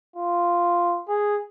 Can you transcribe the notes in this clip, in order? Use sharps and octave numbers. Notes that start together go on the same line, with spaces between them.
F4
G#4